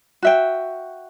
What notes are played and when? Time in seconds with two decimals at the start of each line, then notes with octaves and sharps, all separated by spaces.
0.22 F#4 E5 G5